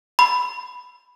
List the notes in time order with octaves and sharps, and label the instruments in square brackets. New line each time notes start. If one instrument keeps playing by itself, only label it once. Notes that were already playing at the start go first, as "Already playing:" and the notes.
[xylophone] B5